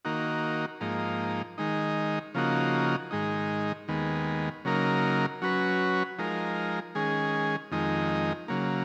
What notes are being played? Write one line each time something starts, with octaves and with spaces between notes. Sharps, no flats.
D#3 A#3 D#4 F#4
G#2 F3 A#3 D#4
D#3 G#3 D#4
C#3 F3 A#3 D#4 F#4
G#2 D#3 G#3 D#4
D#2 D#3 G#3 B3
C#3 F#3 A#3 D#4 A#4
F#3 C#4 F#4 B4
F3 G#3 D#4 A#4
D#3 G#3 C#4 G#4
F2 D#3 G#3 D#4
C#3 F#3 A#3